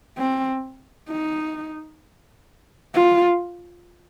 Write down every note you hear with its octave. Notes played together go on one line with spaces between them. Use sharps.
C4
D#4
F4